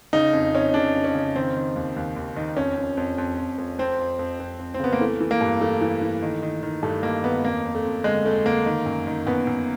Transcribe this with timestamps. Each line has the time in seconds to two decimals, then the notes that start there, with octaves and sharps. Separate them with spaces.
0.13 C#3 D#4
0.33 F2
0.54 F2 C#4
0.74 C#3 D4
0.94 F2
1.04 C#4
1.15 C#3
1.36 D#3 C4
1.56 D#3
1.76 D#2
1.96 D#2
2.16 D#2
2.36 D#3
2.57 F2 C#4
2.78 F2
2.97 F2
3.18 F2
3.38 F2
3.58 F2
3.78 F2 C4
3.99 F2
4.19 F2
4.40 F2
4.59 F2
4.74 C4
4.80 C#3 B3
4.93 A#3
5.01 E3 A3
5.21 E3
5.31 A#3
5.41 G2
5.61 E3 A3
5.81 E3
6.01 E3
6.22 D#3
6.42 D#3
6.63 D#3
6.83 G2 A3
7.03 D#3 A#3
7.23 D#3 B3
7.44 F2 A#3
7.65 F2
7.75 A3
7.85 F2
8.04 D3 G#3
8.25 F2 A3
8.46 D3 A#3
8.66 D#3
8.86 F#2
9.07 D#3
9.27 F#2 B3
9.47 F#2